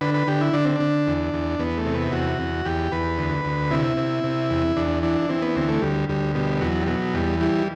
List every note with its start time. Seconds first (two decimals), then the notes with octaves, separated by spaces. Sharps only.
0.01 D3 B4
0.14 B4
0.27 D3 G4
0.41 E4
0.53 D3 D4
0.65 C4
0.76 D3 D4
1.07 E2
1.34 E2
1.59 E2 B3
1.77 A3
1.86 C3
1.95 B3
2.12 E2 F#4
2.39 E2
2.65 E2 G4
2.92 E2 B4
3.18 D2
3.45 D2
3.71 C3 E4
3.97 C3
4.24 C3
4.50 E2
4.76 E2 D4
5.03 E3 D4
5.29 E3 C4
5.42 B3
5.56 D2 C4
5.69 A3
5.82 D2 G3
6.09 D2 G3
6.35 B2 G3
6.61 E2 F#3
6.83 G3
6.87 B2 F#3
7.14 E2 G3
7.40 E3 G3